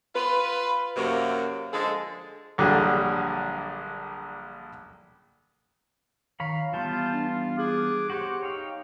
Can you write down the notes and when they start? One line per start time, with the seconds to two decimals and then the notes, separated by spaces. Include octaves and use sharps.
0.15 F4 B4
0.96 F#2 C3 F#3 A#3
1.73 D3 F3 G#3 G#4 A4
2.58 A#1 D3 F#3 G3 G#4
6.40 D#3 C#5 F5 A#5 B5
6.73 E3 G3 B3 F4 A5 G6
7.14 D4
7.59 G#4 D6 F#6
8.10 F#4 G4 C5 C#5
8.43 D#4 C#5 F5 G5